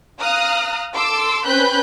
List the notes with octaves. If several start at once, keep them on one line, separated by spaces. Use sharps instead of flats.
F5 A#5 D#6 F6 F#6
A4 C6 D6 E6
C4 C#4 B4 B5 F#6 G6